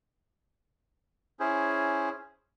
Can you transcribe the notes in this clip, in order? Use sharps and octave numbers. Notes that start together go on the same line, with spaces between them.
C#4 E4 G#4 C5